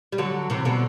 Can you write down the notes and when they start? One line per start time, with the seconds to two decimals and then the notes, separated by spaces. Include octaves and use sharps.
0.12 G3
0.18 D3 F#3
0.50 C3 E3
0.65 B2 D3